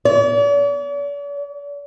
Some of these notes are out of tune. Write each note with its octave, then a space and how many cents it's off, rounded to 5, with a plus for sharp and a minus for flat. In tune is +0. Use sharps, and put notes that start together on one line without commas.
D5 -45